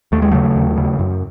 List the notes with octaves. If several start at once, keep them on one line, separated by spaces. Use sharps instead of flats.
D#2 A3
G#3
C#3 F#3 A3
D#2
C#3
F#2